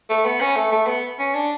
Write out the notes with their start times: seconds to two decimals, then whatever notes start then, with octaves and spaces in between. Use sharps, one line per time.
0.09 A3
0.25 B3
0.40 C#4
0.56 A3
0.72 A3
0.87 B3
1.19 C#4
1.35 D4